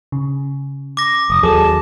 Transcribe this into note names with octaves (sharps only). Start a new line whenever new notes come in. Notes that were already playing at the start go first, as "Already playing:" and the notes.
C#3
D6 A#6
F1 D#6
D#2 F#3 G#4 A4 A5